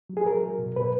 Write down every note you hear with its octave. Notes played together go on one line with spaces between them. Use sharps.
F#3
G#4
F#3 A#4
F#3
B2
B2 B4